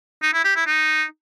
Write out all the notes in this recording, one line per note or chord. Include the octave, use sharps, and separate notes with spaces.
D#4
E4
G4
E4
D#4